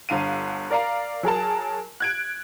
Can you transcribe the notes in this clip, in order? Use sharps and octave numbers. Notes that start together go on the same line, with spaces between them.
G1 D3 F5 D#7
A#4 D5 F5 A#5
F#3 G#4 A#4 A5
F#6 G#6 D7